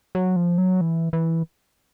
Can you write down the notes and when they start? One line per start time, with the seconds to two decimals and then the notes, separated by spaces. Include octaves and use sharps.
0.15 F#3
0.36 F3
0.58 F#3
0.81 E3
1.13 E3